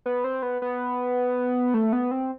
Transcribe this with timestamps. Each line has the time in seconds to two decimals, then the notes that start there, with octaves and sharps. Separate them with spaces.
0.06 B3
0.24 C4
0.42 B3
0.62 B3
1.74 A3
1.93 B3
2.11 C4